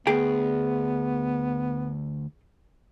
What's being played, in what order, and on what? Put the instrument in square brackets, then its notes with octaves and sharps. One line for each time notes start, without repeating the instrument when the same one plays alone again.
[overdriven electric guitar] D2 [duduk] B3 [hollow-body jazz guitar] G#4 G5